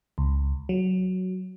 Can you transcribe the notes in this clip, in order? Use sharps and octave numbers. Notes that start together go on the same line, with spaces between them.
C#2
F#3